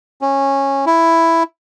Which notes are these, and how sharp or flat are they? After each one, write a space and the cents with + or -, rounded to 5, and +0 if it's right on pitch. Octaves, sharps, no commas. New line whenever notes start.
C#4 -15
E4 +5